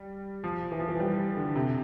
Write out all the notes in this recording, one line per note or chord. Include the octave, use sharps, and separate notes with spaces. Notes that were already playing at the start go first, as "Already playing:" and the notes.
Already playing: G3
F3
E3
F3
E3
G3
D3
C3